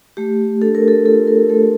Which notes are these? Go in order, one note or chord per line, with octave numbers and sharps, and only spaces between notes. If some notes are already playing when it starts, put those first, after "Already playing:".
A3 G4
D4 A4
A#4
A4
F4 A4
A#4
A3 A4